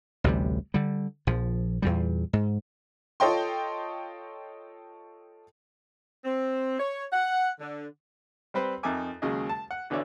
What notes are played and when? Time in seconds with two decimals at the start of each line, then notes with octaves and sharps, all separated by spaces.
0.24 A1 D2 C3 G3
0.74 D3 G3
1.27 A#1 F3
1.82 E2 A#2 G3
2.33 G#2
3.20 F4 A4 C#5 D#5 G5 C6
6.25 C4
6.80 C#5
7.12 F#5
7.59 D3
8.54 G3 C4 B4 C5
8.83 F2 D#4 A#4 E5 G#5 D6
9.22 D#2 C#3 F#3 G#3 D#5
9.49 A5
9.71 F#5
9.90 B1 D3 E3 F#4 C#5 D5